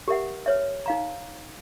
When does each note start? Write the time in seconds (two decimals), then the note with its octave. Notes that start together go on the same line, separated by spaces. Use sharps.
0.08 G4 A#4 E5 F#5
0.46 B4 C#5 E5
0.86 D#4 F5 A#5